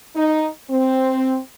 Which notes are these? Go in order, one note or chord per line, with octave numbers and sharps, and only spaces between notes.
D#4
C4